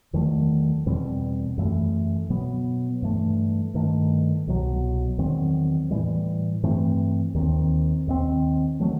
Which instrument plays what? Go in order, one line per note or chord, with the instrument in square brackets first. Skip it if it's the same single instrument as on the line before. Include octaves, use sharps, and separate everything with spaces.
[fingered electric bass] E2 D#3 F#3 A3
E2 B2 G3 C4
F#2 E3 A3
B2 F#3 B3
G2 E3 A3
G2 D#3 A3
C2 B2 F#3
E2 D#3 F#3 C4
A2 E3 G3
G2 E3 A3 C4
D#2 D#3 A3
C4
D#2 D#3 A3 C4
D#3 F#3 A3